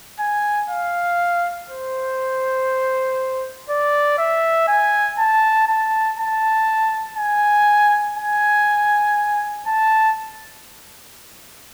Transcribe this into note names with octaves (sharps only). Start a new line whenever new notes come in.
G#5
F5
C5
D5
E5
G#5
A5
A5
A5
G#5
G#5
A5